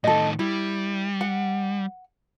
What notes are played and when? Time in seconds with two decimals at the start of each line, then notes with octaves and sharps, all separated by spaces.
0.04 A2 D#3 A4 D#5
0.39 G3 E4
1.21 F#5